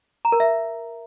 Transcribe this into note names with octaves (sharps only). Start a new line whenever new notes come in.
A#5
A#4
E5